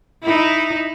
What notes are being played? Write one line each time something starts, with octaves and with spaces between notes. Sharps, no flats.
D#4 E4